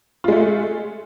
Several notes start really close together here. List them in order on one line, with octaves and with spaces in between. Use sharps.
F4 G#3 A3